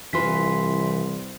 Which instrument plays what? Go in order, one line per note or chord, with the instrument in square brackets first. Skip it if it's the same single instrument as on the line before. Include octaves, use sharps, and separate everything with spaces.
[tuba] C2 [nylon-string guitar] E3 F4 B4 [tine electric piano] C6 B6